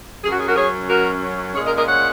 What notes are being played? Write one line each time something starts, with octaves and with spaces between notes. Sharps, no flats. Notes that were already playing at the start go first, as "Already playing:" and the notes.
F#2 F#3 C#4 G#4
F#4
G#4
F#4 A#4
G#4 C#5
F#4 A#4
A#2 G#3 C#4 G#4 C#5
A#4 D#5
A#4 D#5
C#5 F#5